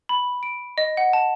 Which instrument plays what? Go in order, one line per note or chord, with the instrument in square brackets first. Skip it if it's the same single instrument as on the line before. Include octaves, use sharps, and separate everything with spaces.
[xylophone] B5
D7
D#5
F#5
A5